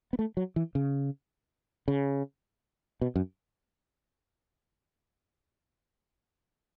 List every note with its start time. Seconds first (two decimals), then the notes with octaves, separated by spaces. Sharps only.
0.13 B3
0.19 A3
0.37 F#3
0.56 E3
0.75 C#3
1.88 C#3
3.01 B2
3.16 F#2